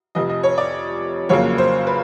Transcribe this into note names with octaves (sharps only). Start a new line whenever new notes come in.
F1 F2 C3 D#5
D#5
C#5
D5
F#1 F2 C#3 F#3 A#3 C#5
C5
B4